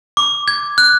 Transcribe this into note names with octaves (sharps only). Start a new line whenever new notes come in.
D6
G#6
F#6